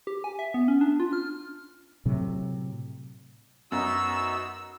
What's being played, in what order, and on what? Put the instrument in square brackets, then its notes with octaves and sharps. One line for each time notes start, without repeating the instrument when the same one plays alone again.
[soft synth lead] G4
G#5
E5
B3
C#4
D4
F4
F6
[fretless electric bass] A2 C3 F#3
[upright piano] F#2 [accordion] B3 D#4 F#4 [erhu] E6